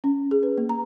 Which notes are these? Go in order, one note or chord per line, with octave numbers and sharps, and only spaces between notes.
C#4
G#4
B4
A#3
A#5